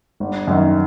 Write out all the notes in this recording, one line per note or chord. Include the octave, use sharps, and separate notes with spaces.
G1
F#2 D#3